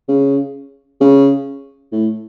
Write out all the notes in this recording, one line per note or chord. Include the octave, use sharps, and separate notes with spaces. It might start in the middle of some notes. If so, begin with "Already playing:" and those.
C#3
C#3
A2